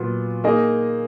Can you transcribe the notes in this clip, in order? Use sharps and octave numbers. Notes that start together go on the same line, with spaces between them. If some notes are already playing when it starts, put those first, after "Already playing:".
Already playing: A#2 F#3 B3
A#3 D#4 G#4 D#5